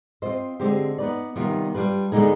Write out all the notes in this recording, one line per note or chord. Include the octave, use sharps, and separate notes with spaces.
C4 F4 C5 D#5
D3 G#3 C4 G4 C5
B3 D#4 B4 D5
C3 D#3 G3 B3 F4
G3 D4 F4 B4
D3 G#3 B3 D#4 G#4